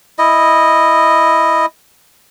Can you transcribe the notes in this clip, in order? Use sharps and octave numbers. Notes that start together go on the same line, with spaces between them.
E4 D#5